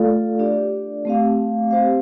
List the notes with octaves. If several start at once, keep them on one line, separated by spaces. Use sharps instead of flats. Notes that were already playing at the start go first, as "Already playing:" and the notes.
Already playing: A3 F4 A4 D5 F5
D4 G4 D5
A3 C4 G4 F5
C4 G4 C5 F5